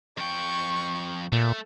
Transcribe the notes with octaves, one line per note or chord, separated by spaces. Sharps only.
F2 G5 C#6
A#2 A3